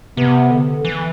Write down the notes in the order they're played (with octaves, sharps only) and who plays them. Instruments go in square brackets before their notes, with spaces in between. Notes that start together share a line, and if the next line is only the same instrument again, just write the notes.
[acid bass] C3 [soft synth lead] B3
[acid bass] D3
E3